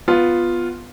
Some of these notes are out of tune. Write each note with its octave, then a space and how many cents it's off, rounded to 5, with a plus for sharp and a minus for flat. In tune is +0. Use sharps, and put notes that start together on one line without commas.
B3 +0 F4 +0